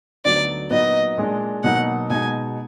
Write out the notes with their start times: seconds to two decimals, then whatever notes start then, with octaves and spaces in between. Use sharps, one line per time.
0.25 D2 D3 F#3 B3 D#4 D5
0.70 A#2 F#3 B3 D#4 D#5
1.17 A#2 G#3 D4
1.64 B2 F#3 A#3 D#4 F#5
2.10 B2 G#3 D#4 G#5